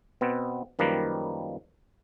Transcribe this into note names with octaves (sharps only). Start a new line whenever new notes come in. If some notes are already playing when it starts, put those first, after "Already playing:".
B2 B3 C4
F#2 D#3 F3 G3 A#3 B4